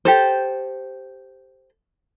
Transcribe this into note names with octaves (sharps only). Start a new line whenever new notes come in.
G4 A4 C5